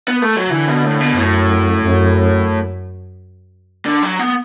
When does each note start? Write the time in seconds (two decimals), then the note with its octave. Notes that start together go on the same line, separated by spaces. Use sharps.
0.08 B3
0.22 A3
0.36 F#3
0.50 D3 E3
0.67 B2
0.84 A2
1.01 B2
1.17 F#2 A2
1.85 F#2
3.86 D3
4.03 F#3
4.19 B3